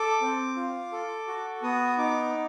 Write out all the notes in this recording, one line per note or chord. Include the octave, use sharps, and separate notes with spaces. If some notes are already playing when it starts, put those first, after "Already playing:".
Already playing: A4 D6
C4
F4
A4
F#4
B3 D#6
D#4 D6